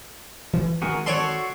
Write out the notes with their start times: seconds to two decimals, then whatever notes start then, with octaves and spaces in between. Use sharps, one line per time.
0.53 E3
0.82 D#3 G#3 C4 F#4 G#4 A#4
1.06 F#4 A4 C#5 D5 C6